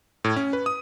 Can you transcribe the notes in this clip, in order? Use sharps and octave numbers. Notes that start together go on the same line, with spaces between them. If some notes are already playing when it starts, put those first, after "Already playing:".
A2
C#4
B4
D#6